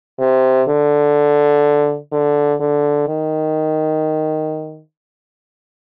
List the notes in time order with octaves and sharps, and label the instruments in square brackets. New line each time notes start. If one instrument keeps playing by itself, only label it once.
[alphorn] C3
D3
D3
D3
D#3